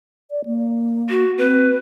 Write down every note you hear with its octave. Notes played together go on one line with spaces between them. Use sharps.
D5
A#3
F#4
C4 B4